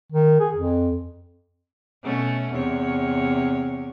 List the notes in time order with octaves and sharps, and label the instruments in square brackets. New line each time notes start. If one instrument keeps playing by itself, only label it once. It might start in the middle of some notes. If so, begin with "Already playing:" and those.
[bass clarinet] D#3
G#4
F2
[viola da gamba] B2 A3 C#4
E2 C3 C#5